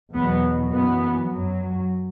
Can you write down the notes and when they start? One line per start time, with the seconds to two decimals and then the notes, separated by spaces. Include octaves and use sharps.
0.14 E2 B2 F#3 B3
0.72 F#2 E3 B3
1.30 F#2 F#3